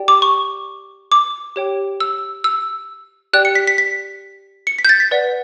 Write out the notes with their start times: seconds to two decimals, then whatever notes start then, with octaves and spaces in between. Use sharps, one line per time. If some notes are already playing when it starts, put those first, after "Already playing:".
Already playing: G4 D5 G5
0.08 D6
0.22 C#6
1.12 D6
1.56 G4 C#5 G5
2.00 E6
2.44 E6
3.33 G4 D5 G5 F#6
3.45 C#7
3.55 B6
3.67 B6
3.78 B6
4.67 C#7
4.79 B6
4.85 G6
4.89 A6
5.00 B6
5.11 B4 D5 F#5